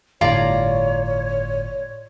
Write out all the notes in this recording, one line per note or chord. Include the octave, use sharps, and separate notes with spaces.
G1 A2 F4 C#5 D5 A#5